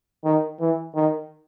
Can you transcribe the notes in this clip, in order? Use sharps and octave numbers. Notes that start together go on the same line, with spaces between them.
D#3
E3
D#3